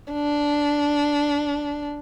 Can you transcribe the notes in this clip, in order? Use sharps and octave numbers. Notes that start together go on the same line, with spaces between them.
D4